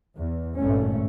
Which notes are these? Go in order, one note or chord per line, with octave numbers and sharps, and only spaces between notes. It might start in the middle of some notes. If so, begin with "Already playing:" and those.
E2
G#1 G2 A#2 A3 C#4